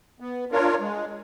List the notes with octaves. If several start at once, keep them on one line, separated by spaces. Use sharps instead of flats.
B3
D4 F4 A#4 C#5
G#3